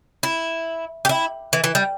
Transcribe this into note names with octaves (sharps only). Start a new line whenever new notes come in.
E4
G4
E4
E3
E3
G3